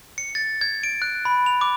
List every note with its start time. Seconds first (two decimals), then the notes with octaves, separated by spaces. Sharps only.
0.18 C#7
0.35 A6
0.61 G#6
0.83 D7
1.02 F#6
1.25 B5
1.46 F7
1.61 D6